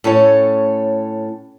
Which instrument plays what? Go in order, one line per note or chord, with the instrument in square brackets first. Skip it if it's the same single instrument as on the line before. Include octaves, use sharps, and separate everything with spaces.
[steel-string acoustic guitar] A2 C#4 A4 C#5